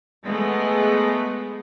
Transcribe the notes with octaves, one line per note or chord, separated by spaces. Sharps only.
G#3 A3 B3